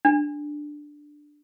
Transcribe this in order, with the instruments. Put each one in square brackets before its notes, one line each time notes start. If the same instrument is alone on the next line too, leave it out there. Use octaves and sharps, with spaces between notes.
[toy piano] D4